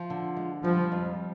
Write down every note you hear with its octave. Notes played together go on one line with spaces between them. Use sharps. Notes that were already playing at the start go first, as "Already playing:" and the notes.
Already playing: F3
D3
G#3
F3 G3
F2